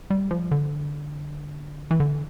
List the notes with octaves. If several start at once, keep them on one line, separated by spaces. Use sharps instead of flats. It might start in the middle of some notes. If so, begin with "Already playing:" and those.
G3
F3
D3
E3
D3